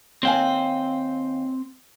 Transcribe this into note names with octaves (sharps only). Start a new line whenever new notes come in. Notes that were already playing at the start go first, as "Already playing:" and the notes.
D#2 C4 F5 G5 G#5